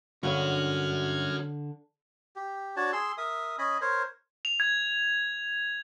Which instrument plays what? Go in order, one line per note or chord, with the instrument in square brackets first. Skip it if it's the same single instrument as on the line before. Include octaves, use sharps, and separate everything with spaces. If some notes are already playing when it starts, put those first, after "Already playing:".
[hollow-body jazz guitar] G2 F#3 [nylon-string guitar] D3 [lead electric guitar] C#4 F#4 [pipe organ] F6 F#6 G#6
[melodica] G4
D4 F#4 C#5 A5
G#4 C6 E6
A#4 E5 D#6
C#4 D#5 G#5 B5
A#4 C5 C#5
[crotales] F7
G#6